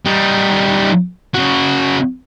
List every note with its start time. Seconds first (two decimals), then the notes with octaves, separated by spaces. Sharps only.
0.06 G3 D#4
1.34 C#3 F#4